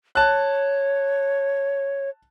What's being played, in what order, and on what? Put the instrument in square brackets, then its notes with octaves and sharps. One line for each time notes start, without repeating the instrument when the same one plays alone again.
[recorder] C#5 [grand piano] A5 F#6